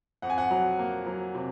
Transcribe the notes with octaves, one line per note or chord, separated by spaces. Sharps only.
F2 F#5
G#5
F#5
F#3
A#3
F#3
C3